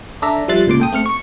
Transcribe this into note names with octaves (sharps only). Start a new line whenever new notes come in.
D4 A4 D5 E5 A#5
F3 G3 E5 C6 F#6 A6
C#2 A#2 C6 D6
A4 G5 D#6
A3 C4 F6 C#7
C#6